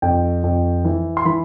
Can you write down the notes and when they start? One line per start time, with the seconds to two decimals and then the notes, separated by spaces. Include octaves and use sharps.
0.02 F2 G5
0.44 F2
0.85 E3
1.17 C6
1.25 E3 B5